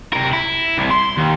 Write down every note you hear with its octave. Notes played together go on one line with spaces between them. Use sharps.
C3 A#4
E4
C2 C3
C6
D#2